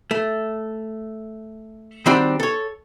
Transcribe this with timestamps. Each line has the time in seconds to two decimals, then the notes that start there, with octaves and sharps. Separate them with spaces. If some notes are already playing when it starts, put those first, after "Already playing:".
0.11 A3
2.06 D#3 G3 C4 D4 F#4 G4
2.40 A4 C#5